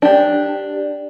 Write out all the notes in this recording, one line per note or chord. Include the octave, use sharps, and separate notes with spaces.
D4 G4